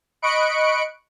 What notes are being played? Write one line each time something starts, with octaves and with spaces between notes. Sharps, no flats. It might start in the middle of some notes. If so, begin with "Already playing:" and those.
D#5 B5 C#6 F#6 C#7 D7